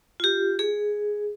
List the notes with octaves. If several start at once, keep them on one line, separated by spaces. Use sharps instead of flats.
F4 G4
G#4